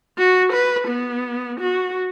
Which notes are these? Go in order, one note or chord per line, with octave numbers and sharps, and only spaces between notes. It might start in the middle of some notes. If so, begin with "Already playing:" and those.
F#4
B4
B3
F#4